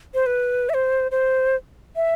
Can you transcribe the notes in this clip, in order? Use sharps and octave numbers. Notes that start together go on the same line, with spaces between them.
C5
B4
E5
C5
C5
E5